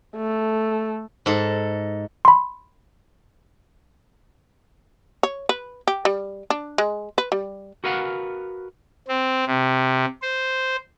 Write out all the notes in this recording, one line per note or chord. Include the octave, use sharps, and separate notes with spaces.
A3
G#2 A4
B5 C6
C#5
B4
G4
G3
D4
G#3
B4
G3
F#4 A#4 B4 F5 F#5
C4
C3
C5